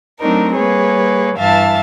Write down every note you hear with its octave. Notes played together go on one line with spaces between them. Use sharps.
F#3 A3 C4 D4 D#4 A#4
G3 A#3 G#4 B4 C#5
G2 E3 E5 F5 A5 A6